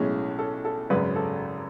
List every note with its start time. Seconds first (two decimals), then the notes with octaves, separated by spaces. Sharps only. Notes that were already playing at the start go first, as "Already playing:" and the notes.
Already playing: B1 A2 G#3 C#4
0.39 A4
0.65 A4
0.90 G#1 F#2 C#3 B4
1.16 A4